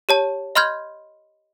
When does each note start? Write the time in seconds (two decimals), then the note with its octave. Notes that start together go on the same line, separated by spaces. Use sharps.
0.09 G4 C#5 A5
0.55 D#5 B5 C6 F6 G6 G#6